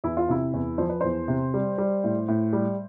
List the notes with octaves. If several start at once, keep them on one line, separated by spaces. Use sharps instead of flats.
E2 E4
F4
C3 E4
E2
F3 C5
B4
E2 C5
C3
G3
G3
A2
A2
G3